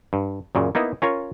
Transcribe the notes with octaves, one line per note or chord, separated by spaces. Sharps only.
G2
F#2 A#2 C#3
A#3 B3 D#4 E4
C#4 F4 A#4 C#5